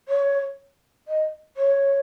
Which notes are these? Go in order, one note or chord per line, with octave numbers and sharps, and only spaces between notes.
C#5
D#5
C#5